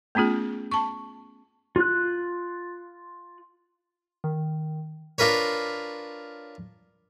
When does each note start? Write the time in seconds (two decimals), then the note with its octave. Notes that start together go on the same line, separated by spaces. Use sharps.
0.15 A3 B3 C#4 F4 G#4
0.71 A5 C#6
1.76 F4 F#6
4.24 D#3
5.18 D4 F4 A#4 B4 C#5